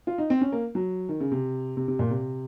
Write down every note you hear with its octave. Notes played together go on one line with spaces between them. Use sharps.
F4
D#4
C4
C#4
A#3
F#3
D#3
C#3
C3
C3
C3
A#2
C3